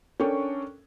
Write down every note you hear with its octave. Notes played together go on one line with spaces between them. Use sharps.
C#4 D4 A4 A#4 G5 C#6